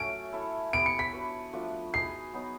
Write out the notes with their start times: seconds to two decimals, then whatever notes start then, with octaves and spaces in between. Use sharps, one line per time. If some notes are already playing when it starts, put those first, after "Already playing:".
Already playing: F#3 A3 C#4 D7
0.32 E4 A4 C#5 E5
0.73 B3 E4 G4 D7
0.86 C#7
0.99 B6
1.13 D4 F#4 B4
1.53 F3 A3 D4 F#4
1.93 D#4 G#4 B4 C7
2.33 F#3 B3 D#4